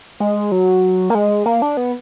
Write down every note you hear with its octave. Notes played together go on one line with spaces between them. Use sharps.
G#3
F#3
A#3
G#3
A#3
D4
B3